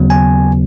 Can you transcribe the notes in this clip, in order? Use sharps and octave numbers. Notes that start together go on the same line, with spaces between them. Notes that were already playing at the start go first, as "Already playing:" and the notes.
Already playing: D#2 C#3 F#3 B3
G#5